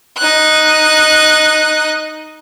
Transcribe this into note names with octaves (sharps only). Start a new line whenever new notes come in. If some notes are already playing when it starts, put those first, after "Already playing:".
D#4 F#6